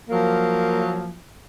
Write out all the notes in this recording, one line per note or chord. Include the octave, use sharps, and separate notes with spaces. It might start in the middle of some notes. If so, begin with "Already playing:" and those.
F3 F#3 A#3